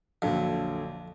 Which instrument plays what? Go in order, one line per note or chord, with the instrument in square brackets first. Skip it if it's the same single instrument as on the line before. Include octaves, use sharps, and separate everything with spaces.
[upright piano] A#1 D3 F#3 [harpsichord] F2